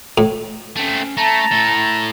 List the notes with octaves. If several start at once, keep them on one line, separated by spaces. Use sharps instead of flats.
A2
A3 C4 C#4
A3 A5 A#5
A2 A4